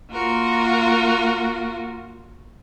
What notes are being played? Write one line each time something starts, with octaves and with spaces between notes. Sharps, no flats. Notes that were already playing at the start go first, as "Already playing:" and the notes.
A#3 F4 F#4 A#4